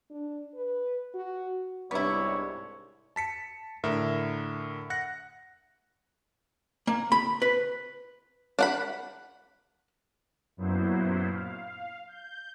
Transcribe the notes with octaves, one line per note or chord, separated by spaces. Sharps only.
D4
B4
F#4
C2 G#2 B3 D4 E4 C#5 C#6
A5 B6 C#7
A2 D3 A#4 E5
F#5 F#6 A#6 C#7
A#3
B5
B4
D4 F#5 B5
F#2 A#2 F#3 B3 E4 C5
F5
G6